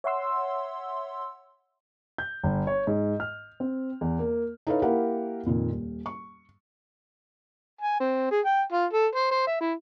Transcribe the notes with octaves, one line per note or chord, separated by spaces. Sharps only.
C#5 E5 F#5 C6 E6
G6
G1
C#5
G#2
F6
C4
E2
A#3
D#4 E4 A4 B4 C#5 F5
A#3 E4 G4 A#4 F5 F#5
F2 A#2 D#3
D#1
C#6
G#5
C4
G#4
G5
F4
A4
C5
C5
E5
E4